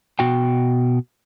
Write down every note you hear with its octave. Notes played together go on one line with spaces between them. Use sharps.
B2 F#4 G5